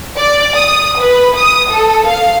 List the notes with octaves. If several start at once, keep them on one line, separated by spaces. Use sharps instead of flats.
D5
D#6
B4
D#6
A4
F5